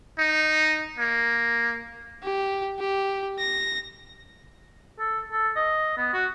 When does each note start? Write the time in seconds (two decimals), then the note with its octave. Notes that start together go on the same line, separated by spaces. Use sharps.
0.19 D#4
0.98 A#3
2.23 G4
2.79 G4
3.39 A#6
4.99 A4
5.32 A4
5.56 D#5
5.97 B3
6.13 F#4